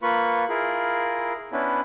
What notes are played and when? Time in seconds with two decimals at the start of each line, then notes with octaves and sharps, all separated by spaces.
0.03 A#3 F4 B4 B5 C#6
0.49 E4 F4 G#4 A#4
1.52 B3 C#4 D4 E4 B4